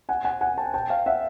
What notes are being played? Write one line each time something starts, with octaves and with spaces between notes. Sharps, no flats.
F#5 G#5
F#5 G#5
F#5 G#5
G5 A5
G5 A5
F5 G5
E5 F#5